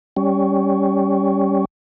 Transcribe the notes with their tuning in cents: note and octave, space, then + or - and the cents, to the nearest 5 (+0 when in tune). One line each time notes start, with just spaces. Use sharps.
G3 +0 C#4 +10